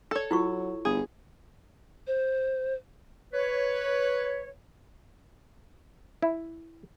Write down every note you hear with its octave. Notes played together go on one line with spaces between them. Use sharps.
A4 C#5
F#3 E4 F4 C#6
G1 G#4
C5
B4 C#5
E4